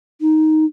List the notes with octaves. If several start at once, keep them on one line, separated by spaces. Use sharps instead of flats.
D#4